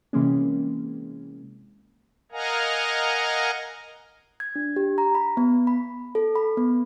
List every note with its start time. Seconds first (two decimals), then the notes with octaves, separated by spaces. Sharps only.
0.13 C3 E3 G#3 A#3 C#4
2.32 A#4 D#5 F5 F#5 G#5 A#5
4.40 G#6
4.56 D4
4.76 G4
4.98 A#5
5.15 B5
5.37 B3
5.67 B5
6.15 A4
6.36 B5
6.57 B3